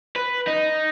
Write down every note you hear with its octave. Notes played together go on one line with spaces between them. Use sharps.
B4
D#4